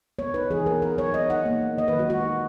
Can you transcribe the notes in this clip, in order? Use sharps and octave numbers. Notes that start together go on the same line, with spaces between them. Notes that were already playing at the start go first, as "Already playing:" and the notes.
B3 C#5
D#4 B4
E3 G#4
B3 A#4
D#4 A#4
F#3 C#5
B3 D#5
D#4 F#5
A#3
D#4
D#3 D#5
B4
F#3
F#4
G#3 F#4
D#4